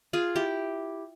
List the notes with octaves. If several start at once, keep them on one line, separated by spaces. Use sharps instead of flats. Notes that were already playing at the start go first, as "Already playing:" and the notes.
F4 G#4
E4 G4